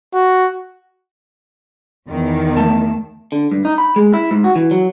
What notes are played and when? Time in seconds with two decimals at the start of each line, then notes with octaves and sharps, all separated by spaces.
0.14 F#4
2.09 E2 D#3
2.56 A3 A5
3.32 D3
3.52 G2
3.65 D#4
3.78 B5
3.96 G#3
4.14 E4
4.31 G#2
4.44 F#4
4.56 E3
4.71 F#3